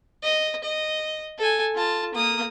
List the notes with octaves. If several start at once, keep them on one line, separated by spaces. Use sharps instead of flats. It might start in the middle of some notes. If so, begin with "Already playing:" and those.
D#5
D#5
A4 G#5
F4 A5
A#3 D#6